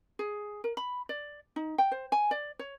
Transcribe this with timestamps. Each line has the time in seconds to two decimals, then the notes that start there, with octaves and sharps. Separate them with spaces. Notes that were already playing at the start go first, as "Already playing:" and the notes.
0.19 G#4
0.64 A#4
0.77 B5
1.09 D5
1.56 D#4
1.78 G5
1.91 C5
2.12 G#5
2.31 D5
2.59 C#5